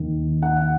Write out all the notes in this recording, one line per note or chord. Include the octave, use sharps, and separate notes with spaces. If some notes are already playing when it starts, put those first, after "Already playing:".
Already playing: D#2 D#3
F#5